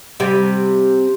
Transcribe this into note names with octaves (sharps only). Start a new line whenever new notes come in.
C3 G3